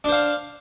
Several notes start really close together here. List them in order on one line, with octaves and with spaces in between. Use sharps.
D4 C5 F5